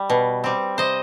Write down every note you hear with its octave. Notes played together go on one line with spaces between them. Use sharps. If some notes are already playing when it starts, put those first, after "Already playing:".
Already playing: G3
B2
G3 C4
C3 C5 D#5